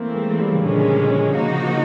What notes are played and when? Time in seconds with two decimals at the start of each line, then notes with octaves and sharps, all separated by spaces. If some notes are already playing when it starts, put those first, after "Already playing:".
Already playing: E3 A3 A#3 C4
0.15 G#3
0.39 G3
0.52 C#3
0.62 A#2 D3 F3 G#3 C#4
1.34 C#3 F3 A#3 D#4 F#4